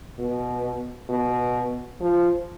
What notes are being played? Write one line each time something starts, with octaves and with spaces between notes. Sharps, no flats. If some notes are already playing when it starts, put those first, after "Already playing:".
B2
B2
F3